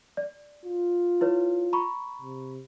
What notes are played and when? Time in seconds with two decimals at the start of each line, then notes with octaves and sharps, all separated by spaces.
0.17 D5
0.65 F4
1.21 E4 B4 C#5
1.73 A#5 B5 C#6
2.22 C3